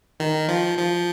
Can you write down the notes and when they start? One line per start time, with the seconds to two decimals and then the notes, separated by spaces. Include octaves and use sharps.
0.20 D#3
0.49 F3
0.78 F3